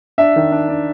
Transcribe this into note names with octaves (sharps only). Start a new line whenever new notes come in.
D4 E5
D#3
D4
D4